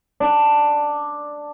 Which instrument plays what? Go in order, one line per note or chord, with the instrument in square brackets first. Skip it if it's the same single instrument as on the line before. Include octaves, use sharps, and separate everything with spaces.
[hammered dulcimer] D4